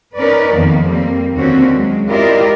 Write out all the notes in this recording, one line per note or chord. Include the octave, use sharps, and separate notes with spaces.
C#4 D#4 A#4 B4 D5
F2 D#3 A#3 B3
G3 A#3 C4
D#2 D3 A#3 C4 C#4 F#4
F#3 G#3
E4 F4 G4 A#4 D5 D#5